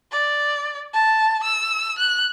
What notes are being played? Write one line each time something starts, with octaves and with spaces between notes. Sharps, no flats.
D5
A5
E6
F#6